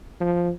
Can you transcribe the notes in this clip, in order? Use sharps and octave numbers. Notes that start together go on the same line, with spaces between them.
F3